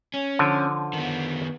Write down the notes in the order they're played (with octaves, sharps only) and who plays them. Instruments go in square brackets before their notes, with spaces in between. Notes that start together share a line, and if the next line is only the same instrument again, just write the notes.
[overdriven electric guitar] C#4
[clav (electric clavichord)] D3 F3
[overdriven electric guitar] D#3 B3